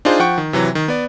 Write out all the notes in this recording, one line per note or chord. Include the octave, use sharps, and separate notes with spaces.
D4 D#4 F4 G#4 C5
F3 F#5 G5 C#6
D#3
C3 E3 F#3
D#3
B3 D5